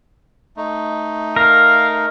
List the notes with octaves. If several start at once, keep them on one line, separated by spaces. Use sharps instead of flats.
A3 D#4
A#4 F5